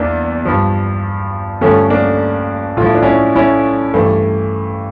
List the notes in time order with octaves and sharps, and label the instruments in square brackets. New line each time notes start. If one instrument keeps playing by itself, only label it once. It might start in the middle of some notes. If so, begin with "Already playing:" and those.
Already playing: [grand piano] E2 A#3 D4
G2 F3
G2 D3 F3 A3 C#4
A#3 D4
A2 F4
F3 E4
D4
C#4 E4
C#4 E4
G2 E3 A3